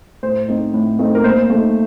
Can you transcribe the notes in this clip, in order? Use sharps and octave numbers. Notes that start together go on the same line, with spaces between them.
A2 C5
A3 C4 D#4
A2
A3 C4 D#4
A#4
A#2 C5
A3 D#4